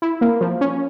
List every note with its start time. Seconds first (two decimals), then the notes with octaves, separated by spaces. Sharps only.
0.02 E4
0.21 A#3
0.41 F3
0.61 C#4